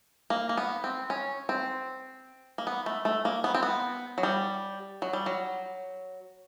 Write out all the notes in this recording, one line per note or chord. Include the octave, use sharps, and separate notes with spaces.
A#3
A#3
B3
C4
C#4
C4
A#3
B3
A3
A3
A#3
B3
C4
B3
F#3
G3
F#3
G3
F#3